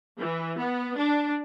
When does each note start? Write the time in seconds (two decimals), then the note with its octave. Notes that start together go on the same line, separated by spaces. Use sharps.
0.18 E3
0.58 B3
0.96 D4